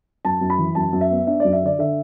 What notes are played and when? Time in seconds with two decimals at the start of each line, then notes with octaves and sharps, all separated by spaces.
0.25 F#2 A5
0.41 F#2
0.50 B5
0.58 E3
0.75 F#2 A5
0.93 F#2
1.01 E5
1.11 B3
1.27 D4 E5
1.40 F#2 D5
1.53 E5
1.63 D3 D5
1.79 D3 E5